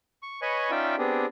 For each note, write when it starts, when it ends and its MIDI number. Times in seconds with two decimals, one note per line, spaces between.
0.23 0.40 85
0.42 0.71 71
0.42 0.71 73
0.42 0.71 75
0.42 0.71 80
0.42 0.71 83
0.42 0.71 85
0.71 0.96 61
0.71 0.96 63
0.71 0.96 65
0.71 0.96 74
0.71 0.96 76
0.71 0.96 79
0.98 1.26 59
0.98 1.26 60
0.98 1.26 62
0.98 1.26 67
0.98 1.26 68